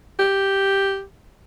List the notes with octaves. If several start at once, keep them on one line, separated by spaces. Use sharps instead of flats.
G4